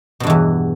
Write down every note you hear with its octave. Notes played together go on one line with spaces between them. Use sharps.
E2 G2 B2 E3